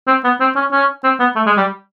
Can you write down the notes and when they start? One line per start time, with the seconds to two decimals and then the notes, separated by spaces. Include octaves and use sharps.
0.07 C4
0.24 B3
0.40 C4
0.55 C#4
0.72 C#4
1.04 C4
1.20 B3
1.36 A3
1.46 G#3
1.57 G3